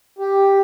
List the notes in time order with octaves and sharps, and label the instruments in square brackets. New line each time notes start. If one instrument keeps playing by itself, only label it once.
[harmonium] G4